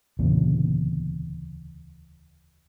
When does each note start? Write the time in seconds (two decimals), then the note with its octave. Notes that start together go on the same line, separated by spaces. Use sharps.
0.19 D1 E2 A#2 C#3